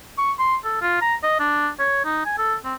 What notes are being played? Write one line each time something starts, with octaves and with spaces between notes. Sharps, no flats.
C#6
C6
A4
F4
A#5
D#5
D4
C#5
D#4
G#5
A4
C4